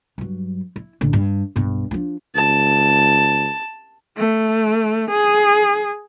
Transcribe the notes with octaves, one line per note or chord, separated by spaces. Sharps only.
G2 F#3
E4
A1 D3
G2
B1 G2
F3 D4
C#2 A5
A3
G#4